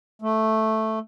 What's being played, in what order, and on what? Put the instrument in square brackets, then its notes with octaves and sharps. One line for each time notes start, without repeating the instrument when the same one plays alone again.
[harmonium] A3